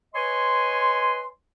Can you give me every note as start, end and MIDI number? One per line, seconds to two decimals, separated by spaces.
0.15 1.27 71
0.15 1.27 73
0.15 1.27 75
0.15 1.27 80
0.15 1.27 84